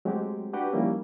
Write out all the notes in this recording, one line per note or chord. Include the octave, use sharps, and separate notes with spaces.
F#3 G#3 A3 C4 F#4 G4
D4 F#4 G4 B4 F#5 G5
D#3 F3 G3 A#3 C#4 E4